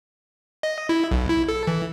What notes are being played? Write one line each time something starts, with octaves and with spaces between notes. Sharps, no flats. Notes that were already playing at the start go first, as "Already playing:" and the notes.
D#5
E4
B1
E4
A4
E3